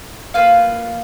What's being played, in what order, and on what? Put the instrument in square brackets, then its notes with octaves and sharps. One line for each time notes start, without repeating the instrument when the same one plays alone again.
[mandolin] A#3 F4 B4 F5